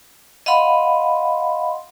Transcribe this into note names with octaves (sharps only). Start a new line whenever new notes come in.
D#5 F5 F#5 B5 C6